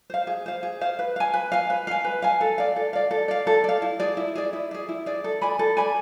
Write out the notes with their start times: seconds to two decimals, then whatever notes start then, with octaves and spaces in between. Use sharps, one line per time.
0.10 C5 F5
0.27 G#4
0.46 C5 F5
0.63 G#4
0.81 C5 F5
0.99 B4
1.16 F5 G#5
1.33 B4
1.52 F5 G#5
1.70 B4
1.87 F5 G#5
2.05 B4
2.22 F5 G#5
2.41 A4
2.58 D5 F5
2.76 A4
2.93 D5 F5
3.11 A4
3.28 D5 F5
3.47 A4
3.64 D5 F5
3.82 E4
3.99 G#4 D5
4.17 E4
4.35 G#4 D5
4.53 E4
4.71 G#4 D5
4.89 E4
5.06 G#4 D5
5.24 A4
5.42 D5 G#5 B5
5.59 A4
5.77 D5 G#5 B5